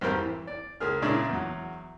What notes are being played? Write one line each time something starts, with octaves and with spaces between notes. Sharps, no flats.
G#1 F2 G3 C4 A#4 C5
E3
D5
C#2 A#3 G#4 F6
A#2 C#3 G#3 C#4 D4 E4
E2 F#3